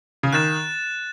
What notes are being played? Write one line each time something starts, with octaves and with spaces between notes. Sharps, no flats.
C#3
D#3 F#6 A6 E7